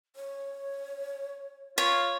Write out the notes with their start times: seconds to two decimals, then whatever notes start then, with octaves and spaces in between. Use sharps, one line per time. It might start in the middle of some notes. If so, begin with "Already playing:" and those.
0.16 C#5
1.78 F4 C#5